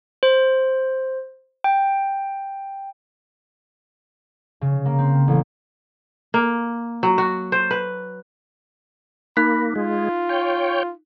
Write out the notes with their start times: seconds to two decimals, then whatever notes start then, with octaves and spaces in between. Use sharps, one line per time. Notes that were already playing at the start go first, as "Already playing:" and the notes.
0.23 C5
1.64 G5
4.61 C#3
4.85 A#3
4.98 C4
5.28 A1
6.34 A#3
7.03 F#3
7.18 F#4
7.52 C5
7.71 B4
9.37 A#3 D#4 B5 F#6 B6
9.76 G#3 F4
10.29 C#5 G5